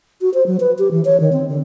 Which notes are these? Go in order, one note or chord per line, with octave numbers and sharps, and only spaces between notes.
F#4
C5
F#3
B4
G4
E3
C#5
D#3
C4
D3